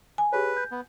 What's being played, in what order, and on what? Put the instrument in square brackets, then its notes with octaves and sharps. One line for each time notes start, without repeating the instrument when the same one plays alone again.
[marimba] G#5
[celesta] G4 G#4 C#5 [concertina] B4
[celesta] G6
[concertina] B3